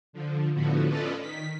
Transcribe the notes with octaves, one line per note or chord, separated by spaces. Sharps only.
D3 F3
A2 D3 F3 B3 F#4
C#4 F4 A4 B4 D5 D#5
D#3 B6